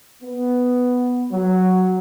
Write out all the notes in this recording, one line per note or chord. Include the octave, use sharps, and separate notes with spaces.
B3
F#3